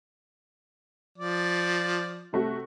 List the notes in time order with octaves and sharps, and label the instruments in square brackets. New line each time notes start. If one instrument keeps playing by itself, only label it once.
[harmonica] F3 D5
[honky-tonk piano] C3 A3 F#4